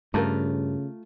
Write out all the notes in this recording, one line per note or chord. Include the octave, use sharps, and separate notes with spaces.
G2 C#3 A3 F4 A#4